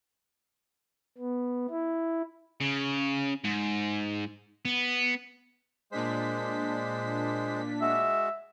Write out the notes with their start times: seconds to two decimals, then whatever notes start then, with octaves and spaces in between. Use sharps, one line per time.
1.18 B3
1.70 E4
2.61 C#3
3.44 G#2
4.65 B3
5.92 A#2 G#3 D4 C5 B6
7.81 G#3 F#4 E5